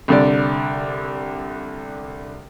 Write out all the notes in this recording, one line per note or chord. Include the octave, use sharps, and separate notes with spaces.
C2 D3 D5